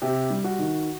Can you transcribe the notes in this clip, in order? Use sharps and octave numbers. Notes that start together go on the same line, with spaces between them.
C3 G4
G3
F#4
D#3